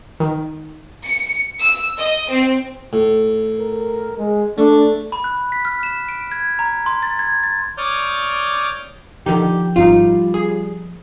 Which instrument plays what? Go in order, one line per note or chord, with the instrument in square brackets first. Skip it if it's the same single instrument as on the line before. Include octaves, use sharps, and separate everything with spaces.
[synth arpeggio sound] D#3
[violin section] C#7
E6
D#5
C4
[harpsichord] A2
[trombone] A#4
G#3
[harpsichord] A3 [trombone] D4
[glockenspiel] B5
F#6
B6
F6
E7
D7
G#6
A#5
C6
A6
G#6
A6
[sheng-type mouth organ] C#5 D5 D6 D#6 F6 G6
[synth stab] D3 D#3 D#4 [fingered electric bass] F3 [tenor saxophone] G4
[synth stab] G#1 G#2 D#4 [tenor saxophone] G3 [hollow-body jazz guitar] F4
[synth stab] G#4